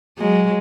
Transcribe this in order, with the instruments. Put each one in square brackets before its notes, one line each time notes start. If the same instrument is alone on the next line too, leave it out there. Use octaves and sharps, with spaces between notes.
[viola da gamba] F#3 G#3